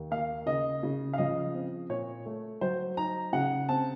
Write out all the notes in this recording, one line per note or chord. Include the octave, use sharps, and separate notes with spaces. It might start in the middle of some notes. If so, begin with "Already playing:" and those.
Already playing: D#2
A#3 F5
C#3 D#5
C#3
F5
F3 D#5
C4
A#2 C#5
A3
F#3 C5
D#4 A#5
C#3 F#5
C4 A5